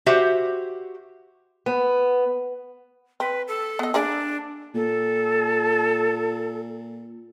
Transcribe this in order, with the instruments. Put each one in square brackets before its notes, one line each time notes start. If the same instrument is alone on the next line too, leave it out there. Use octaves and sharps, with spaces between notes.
[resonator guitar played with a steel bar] F#4 G4 C5 E5
[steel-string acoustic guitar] B3
[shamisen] C4 [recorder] B4
[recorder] A4
[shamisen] B3 D#5
[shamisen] A#3 G#4 D5 [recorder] D4
[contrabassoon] A#2 [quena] A4